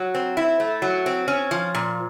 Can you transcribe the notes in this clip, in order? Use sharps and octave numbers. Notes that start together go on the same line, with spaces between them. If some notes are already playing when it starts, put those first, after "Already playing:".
Already playing: F#3
C4
E4
A3
F#3
C4
C#4
F3
A#2